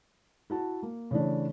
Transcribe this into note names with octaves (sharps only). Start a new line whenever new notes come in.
E4 F#4 A5
A#3
C#3 E3 A3 D4